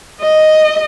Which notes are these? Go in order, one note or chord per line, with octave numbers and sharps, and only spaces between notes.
D#5